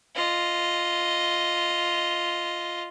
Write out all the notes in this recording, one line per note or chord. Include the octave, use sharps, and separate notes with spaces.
F4 D#5